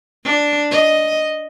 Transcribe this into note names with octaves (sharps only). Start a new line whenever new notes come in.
D4
D#5